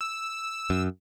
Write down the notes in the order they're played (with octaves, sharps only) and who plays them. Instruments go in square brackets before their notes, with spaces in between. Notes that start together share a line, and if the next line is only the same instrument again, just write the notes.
[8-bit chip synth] E6
[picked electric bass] F#2